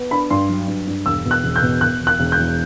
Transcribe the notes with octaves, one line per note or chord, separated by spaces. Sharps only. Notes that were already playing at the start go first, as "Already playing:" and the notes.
Already playing: B3
D4 B5
G2 C6
F#3
G2
G2
E1 E6
B2
F#6
E1
G6
B2
B2 F#6
E1
F#6
E1
G6
E2